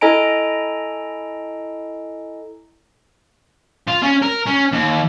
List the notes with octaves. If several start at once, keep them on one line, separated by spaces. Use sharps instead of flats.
E4 A4 D#5 G#5 A#5 D7
F4
C#4
A#4
C#4
D#2